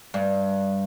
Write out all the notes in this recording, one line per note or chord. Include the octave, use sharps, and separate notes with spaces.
G2